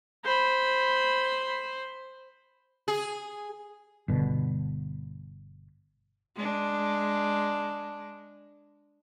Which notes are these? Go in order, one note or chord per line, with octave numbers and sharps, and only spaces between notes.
C5 B5
G#4
G1 B2 D3
G#3 D4